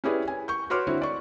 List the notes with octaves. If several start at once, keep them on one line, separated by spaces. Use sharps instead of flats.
C#4 E4 G4 G#4 B4 D5
G#5
C#6 G6
F#4 B4 C#5 C6 D6 F6
D3 C4 E4 F#4
D5 C#6